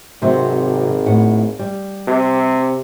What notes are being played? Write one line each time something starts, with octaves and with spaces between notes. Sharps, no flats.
G#1 C3 F#3 C4
A2 F#5
G3
C3